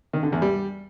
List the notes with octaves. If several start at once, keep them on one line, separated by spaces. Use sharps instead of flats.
D#3
D3
E2
G3